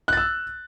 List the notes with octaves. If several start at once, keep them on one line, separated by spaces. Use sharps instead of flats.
E6 F#6 A6